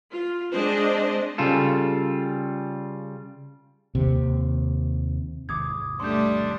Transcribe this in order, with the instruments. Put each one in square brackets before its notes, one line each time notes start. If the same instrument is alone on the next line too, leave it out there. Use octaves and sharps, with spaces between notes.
[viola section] F4
G#3 C4 D4 C5 D#5
[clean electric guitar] C#3 G3 F4 A4
[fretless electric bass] D#2 C3
[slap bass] G#1 E2 C3 [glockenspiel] D6 D#6 G#6
[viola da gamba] G3 A3 [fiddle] D4 [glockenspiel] C6 G6